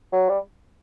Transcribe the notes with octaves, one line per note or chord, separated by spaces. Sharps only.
F#3
G3